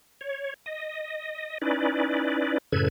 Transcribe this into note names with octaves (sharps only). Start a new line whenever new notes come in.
C#5
D#5
C#4 D#4 E4 B4 D5
F#2 A2 C#3 A4 B4 G#6